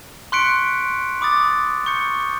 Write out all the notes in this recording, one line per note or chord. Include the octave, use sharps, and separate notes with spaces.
C6 C#6 F#6 B6 C#7 D7
B5 D6 D#6 A6
C#6 G6 C#7